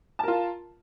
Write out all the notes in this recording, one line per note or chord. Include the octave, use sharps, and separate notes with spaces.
F4 A#4 A5